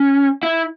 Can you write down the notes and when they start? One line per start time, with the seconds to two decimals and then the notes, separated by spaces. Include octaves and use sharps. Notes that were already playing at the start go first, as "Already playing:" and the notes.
Already playing: C#4
0.43 E4